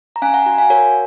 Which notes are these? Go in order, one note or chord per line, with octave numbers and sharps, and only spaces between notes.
A#5
C#4 F5 G#5
F#5 A#5
F#4 F#5 A#5
F5 G#5
F#4 A#4 C#5